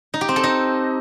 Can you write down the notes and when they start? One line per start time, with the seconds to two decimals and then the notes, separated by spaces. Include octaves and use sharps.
0.14 D#4
0.21 G4
0.29 C4
0.36 A4
0.43 D#4